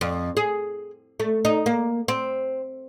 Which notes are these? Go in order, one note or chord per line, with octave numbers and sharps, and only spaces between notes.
F2
G#4
A3
D#4
A#3
C4